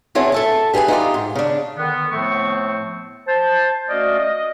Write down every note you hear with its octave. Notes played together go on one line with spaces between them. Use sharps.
B3 C4 E4 G#4 C#5 A5
A4 E5 A5
G4 G#4 B4 G5 G#5
D#4 F4 G4
G#2
C#3 D4
D3 D#3 B3
A2 F3 A3 B3 C4 C#6
C5 A5
A3 C#4 F#4 D5 D#5 F5
D#5